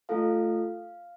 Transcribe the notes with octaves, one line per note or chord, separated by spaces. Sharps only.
A3 F4 A4 F5